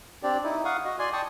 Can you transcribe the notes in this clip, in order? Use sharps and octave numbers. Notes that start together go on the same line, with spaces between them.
C4 D4 G4 D5
D#4 E4
F5 F#5 C#6 D#6
F#4 D#5
D5 G#5 C6
G5 A5 C#6 D#6